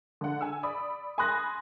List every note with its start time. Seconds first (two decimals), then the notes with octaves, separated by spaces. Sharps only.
0.21 D3 F#5
0.41 G#5 E6
0.63 D5 B5 D#6
1.18 G#5 B5 C6 D#6 F#6 A#6